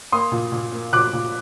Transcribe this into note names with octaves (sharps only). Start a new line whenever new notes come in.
A#3 C6 D#6
A#2
A#2
A#3
A#2 D6 F#6
A#2